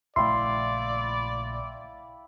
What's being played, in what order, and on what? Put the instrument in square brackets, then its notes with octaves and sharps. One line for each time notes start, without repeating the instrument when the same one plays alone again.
[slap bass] A#1 C#3 A3 [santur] E4 F5 G5 [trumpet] D5 [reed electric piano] C6